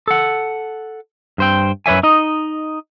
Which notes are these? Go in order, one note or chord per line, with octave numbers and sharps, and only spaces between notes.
A4 F#5
G2 C5 G5
F#2 B4 C#5 E5 G#5
D#4 D#5